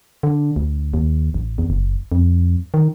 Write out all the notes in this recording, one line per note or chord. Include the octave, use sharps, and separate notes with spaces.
D3
D2
D#2
A1
E2
F#1
F2
D#3